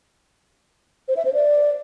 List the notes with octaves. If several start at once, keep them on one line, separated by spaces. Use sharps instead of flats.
C5
E5
C5
D5